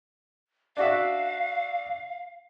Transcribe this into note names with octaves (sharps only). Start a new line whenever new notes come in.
D4 F#4 E5 F5